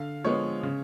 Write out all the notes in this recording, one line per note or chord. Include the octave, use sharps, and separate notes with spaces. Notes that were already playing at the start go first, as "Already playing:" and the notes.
Already playing: D3 F5
F3 G#3 B3 C#5
C#3